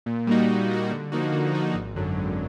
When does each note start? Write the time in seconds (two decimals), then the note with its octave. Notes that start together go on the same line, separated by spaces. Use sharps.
0.06 A#2
0.27 G3 A#3 D#4 F#4
0.48 A#2
0.70 G3 A#3 D#4 F#4
0.91 D3
1.12 F3 A#3 D#4 F#4
1.32 D3
1.53 F3 A#3 D#4 F#4
1.74 G#1
1.96 F#2 D3 F#3
2.17 G#1